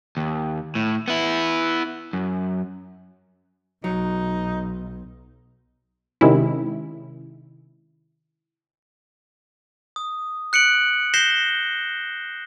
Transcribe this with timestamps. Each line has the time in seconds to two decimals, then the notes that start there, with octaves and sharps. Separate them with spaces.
0.17 D#2
0.75 A2
1.08 B3 E4
2.13 F#2
3.84 B1 F#3 D#4
6.21 C3 D#3 G#3 C#4 E4
9.96 D#6
10.53 F#6 C#7 D7 F#7
11.14 G6 A#6 C7 E7 G7